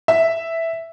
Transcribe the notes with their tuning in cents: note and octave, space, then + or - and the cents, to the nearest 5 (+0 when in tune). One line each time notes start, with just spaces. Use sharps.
E5 +0